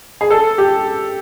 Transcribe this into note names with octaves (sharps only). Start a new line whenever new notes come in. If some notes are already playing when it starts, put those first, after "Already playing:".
G#4
A4
G4